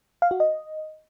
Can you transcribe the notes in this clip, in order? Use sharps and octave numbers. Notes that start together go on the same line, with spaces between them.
F5
F#4
D#5